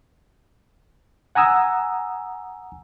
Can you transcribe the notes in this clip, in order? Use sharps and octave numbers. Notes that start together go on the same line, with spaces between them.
F#5 G#5 A#5 D#6 E6